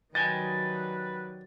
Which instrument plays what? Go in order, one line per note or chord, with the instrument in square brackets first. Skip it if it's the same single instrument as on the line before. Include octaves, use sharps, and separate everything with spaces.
[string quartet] D#3 F#3 G3 [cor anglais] B4 [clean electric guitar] D#5 G5 G#5 [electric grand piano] A6